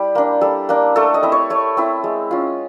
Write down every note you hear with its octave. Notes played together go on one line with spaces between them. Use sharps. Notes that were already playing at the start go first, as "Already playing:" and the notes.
Already playing: G3 E4 G4
A#3 D4
G3 A4
A#3 D4
A3 A4
D#5
C4 E4
C#5
A3 C#5
C4 E4
G#3
C#4 F4